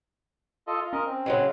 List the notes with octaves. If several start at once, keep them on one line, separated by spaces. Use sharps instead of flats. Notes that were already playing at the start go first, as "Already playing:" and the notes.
F4 A4 D#5
F4
C#4 A#4 D#5
C4
C#3 F#3 G#3